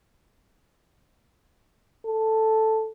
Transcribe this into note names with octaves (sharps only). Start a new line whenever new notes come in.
A4